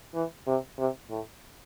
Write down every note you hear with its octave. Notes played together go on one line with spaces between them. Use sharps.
E3
C3
C3
A2